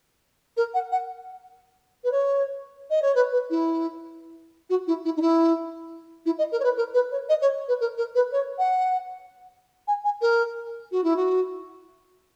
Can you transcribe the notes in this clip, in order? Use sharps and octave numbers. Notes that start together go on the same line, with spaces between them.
A#4
F#5
F#5
B4
C#5
D#5
C#5
B4
B4
E4
F#4
E4
E4
D#4
E4
E4
D#5
A#4
C#5
B4
A#4
B4
C#5
D#5
C#5
B4
A#4
A#4
B4
C#5
F#5
G#5
G#5
A#4
F#4
E4
F#4